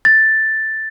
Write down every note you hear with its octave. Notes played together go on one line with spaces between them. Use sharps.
A6